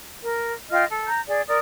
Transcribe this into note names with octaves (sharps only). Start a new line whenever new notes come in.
A#4
F4 D#5 G5 F6
A4
A#5 G6
G#4 D5
A#4 D5 D#6